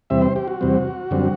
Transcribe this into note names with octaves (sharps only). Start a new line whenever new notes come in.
E2 C3 G3 C4 E5
C5
G4
F#4
E2 C3 G3 C4
F#2 D3 G3 C4